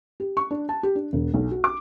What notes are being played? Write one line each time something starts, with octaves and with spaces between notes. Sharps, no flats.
G4
C#6
D4
A5
G4
D4
E1
B1
F#4
D6